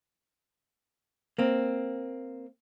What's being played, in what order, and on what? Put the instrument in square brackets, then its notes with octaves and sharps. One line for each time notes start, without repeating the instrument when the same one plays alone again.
[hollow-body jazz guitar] A#3 C4